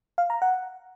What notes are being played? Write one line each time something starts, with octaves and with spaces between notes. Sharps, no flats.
F5
A#5
F#5